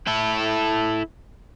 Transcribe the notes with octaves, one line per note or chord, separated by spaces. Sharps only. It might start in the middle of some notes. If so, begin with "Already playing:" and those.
E4 A4